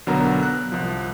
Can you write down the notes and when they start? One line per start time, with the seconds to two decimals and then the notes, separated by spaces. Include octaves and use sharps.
0.07 B1 D3 F#3 B3 A#4 A#5
0.43 F#6
0.72 C2 F3